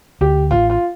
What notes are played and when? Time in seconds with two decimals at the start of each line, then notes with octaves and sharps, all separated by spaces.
0.21 D2 G4
0.51 A1 F4
0.70 F4